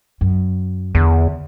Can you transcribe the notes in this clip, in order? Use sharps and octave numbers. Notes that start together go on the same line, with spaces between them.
F#2
E2 D3